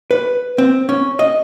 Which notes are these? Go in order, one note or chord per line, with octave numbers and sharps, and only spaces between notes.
B4
C4
C#4
D#5